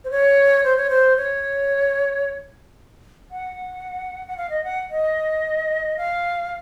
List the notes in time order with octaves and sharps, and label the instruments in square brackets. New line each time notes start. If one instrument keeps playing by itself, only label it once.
[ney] C5
C#5
C5
C#5
C5
C#5
F#5
F#5
F5
D#5
F#5
D#5
F5